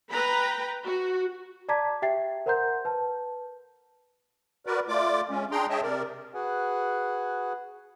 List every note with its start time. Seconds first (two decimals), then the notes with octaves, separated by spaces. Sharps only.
0.11 B4 G5 A#5 B5
0.84 F#4
1.69 D5 A5 A#5 D6 G#6 B6
2.02 G4 E5 G5 A6 C7
2.46 A#4 C5 F#5 A#5 C6 G6
2.85 B4 A5
4.66 F#4 A#4 B4 D5
4.88 A3 F4 D5 D6
5.30 G#3 C#4
5.51 D4 G#4 G5 A#5 C6
5.70 G#4 C#5 D#5 E5 G5 A5
5.82 C3 A#4 D5
6.34 F#4 G#4 B4 F#5 G#5